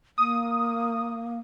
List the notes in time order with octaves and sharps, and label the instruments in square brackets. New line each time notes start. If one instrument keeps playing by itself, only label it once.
[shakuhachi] A#3 [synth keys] D#6